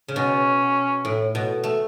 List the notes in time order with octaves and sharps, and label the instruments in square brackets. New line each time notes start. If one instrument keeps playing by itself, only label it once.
[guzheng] C#3
[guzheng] B2 [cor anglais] C#4
[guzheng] A2
B2
A3